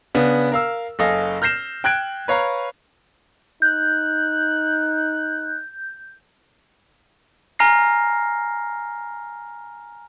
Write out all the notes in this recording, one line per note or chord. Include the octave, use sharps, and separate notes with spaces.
C#3 B3 D4
A#4 F5 E6
F#1 A4 D#5 F5 G#5
F6 G6 A#6 C7 E7
G5 F#6 G#6 D7
B4 C#5 F5 A#5
D#4 F#6 G6
G#5 A#5 F6 A#6 C7